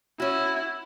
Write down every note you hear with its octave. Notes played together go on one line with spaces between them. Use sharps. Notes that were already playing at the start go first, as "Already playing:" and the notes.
C#4 E4 F#4